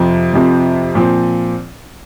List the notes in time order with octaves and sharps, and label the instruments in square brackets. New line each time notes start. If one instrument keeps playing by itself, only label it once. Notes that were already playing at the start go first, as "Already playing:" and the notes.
Already playing: [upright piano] F2 C3 F3 C4
F2 C3 F3 C4
A#2 F3 C4